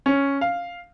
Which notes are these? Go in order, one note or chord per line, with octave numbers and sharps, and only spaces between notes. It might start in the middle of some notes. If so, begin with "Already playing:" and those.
C#4
F5